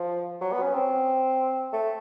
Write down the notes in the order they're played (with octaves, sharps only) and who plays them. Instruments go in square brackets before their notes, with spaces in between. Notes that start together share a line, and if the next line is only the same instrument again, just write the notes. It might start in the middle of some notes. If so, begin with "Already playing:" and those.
Already playing: [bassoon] F3
F#3
B3
C#4
C4
A3